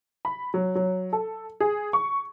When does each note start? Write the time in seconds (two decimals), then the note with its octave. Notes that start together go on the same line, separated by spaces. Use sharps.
0.25 B5
0.54 F#3
0.75 F#3
1.13 A4
1.60 G#4
1.93 C#6